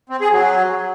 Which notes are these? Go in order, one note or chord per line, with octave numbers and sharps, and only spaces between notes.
C4
G#4
F#3